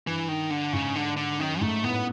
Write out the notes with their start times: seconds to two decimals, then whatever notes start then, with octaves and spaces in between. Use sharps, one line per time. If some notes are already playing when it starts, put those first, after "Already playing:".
0.06 G2 E3
0.28 D#3
0.50 D3
0.73 G#2 C#3
0.96 D3
1.17 D3
1.39 F#2 D#3
1.61 G#2 A3
1.83 A2 B3